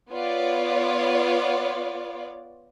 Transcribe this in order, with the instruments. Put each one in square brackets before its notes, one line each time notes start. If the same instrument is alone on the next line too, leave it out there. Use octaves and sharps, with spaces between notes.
[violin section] B3 F4 C#5 D5